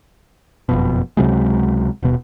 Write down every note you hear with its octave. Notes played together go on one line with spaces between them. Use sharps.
F#1 F2 B2
C#2 C3 F#3 G#3
D#1 B2